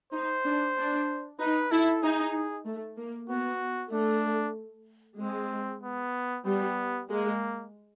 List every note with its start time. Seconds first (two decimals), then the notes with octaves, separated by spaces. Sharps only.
0.13 D#4 C5
0.44 D4
0.77 D4
1.39 D#4 B4
1.71 E4 A4
2.03 D#4 G#4
2.66 A3
2.98 A#3
3.30 B3 F#4
3.93 A3 D4
5.19 G#3 C4
5.83 B3
6.46 G3 B3
7.09 G#3 A#3